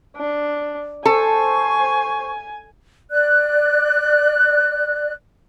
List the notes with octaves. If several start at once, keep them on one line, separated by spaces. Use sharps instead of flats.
D4
A4 C5 G#5 C#6
D5 F#6